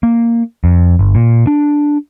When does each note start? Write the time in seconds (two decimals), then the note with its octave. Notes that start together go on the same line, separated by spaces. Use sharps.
0.03 A#3
0.64 F2
0.99 G1
1.15 A#2
1.47 D4